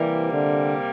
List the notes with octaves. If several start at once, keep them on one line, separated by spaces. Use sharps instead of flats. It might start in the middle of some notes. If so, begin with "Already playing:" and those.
Already playing: C3 E3 G3 A#3
D3